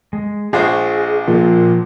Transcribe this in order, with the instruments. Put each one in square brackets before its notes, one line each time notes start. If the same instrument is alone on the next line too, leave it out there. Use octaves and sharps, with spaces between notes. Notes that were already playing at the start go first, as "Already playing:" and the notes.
[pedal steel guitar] G#3
[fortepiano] A#1 F4 C5 [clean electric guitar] G#4 [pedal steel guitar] D#5 F#5 C#6
[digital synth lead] A#2 [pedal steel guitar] F3